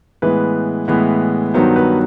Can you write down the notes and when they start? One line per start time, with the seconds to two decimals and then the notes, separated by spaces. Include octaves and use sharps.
0.22 A2 E3 G#3 B3 B4
0.88 A2 E3 G#3 B3
1.54 G2 D#3 F#3 B3 C5
1.76 B4